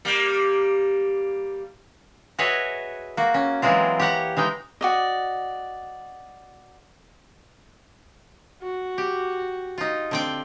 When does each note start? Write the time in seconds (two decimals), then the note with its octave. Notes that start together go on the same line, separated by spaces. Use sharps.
0.05 G3 A#3
2.39 F#4 G#4 B4 C#5 D#5 E5
3.17 A#3 F#4
3.34 C#4
3.62 E3 F#3 G#3 C4 F4
3.99 G4 C#5 F#5 A#5
4.37 E3 G#3 D#4 G5
4.81 F#4 D5 D#5
8.62 F#4
8.98 G4
9.78 D#4 F4
10.11 D3 C4 G5